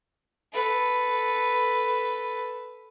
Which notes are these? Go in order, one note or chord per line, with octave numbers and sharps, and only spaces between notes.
A4 B4